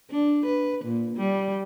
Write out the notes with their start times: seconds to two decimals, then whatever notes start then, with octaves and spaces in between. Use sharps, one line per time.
0.10 D4
0.46 B4
0.85 A#2
1.16 G3